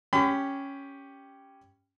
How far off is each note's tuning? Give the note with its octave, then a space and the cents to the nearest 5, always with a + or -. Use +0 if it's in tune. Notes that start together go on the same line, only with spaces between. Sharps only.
C#4 +0 G4 +0 B5 +40